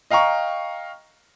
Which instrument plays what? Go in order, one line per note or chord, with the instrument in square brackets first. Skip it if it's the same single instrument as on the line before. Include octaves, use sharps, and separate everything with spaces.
[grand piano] D#5 F5 G5 A#5 C#6